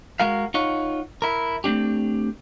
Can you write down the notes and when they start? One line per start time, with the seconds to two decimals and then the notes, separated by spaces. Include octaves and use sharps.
0.20 G#3 F#4 A#4 F5
0.54 D#4 F4 C#5 F#5
1.22 E4 A#4
1.64 A3 A#3 C4 D4 G4